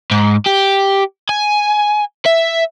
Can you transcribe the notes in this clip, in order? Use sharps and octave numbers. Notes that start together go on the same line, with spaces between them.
G#2
G4
G#5
E5